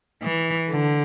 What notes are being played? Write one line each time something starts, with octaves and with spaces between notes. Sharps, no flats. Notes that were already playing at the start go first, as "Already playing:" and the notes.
E3
D3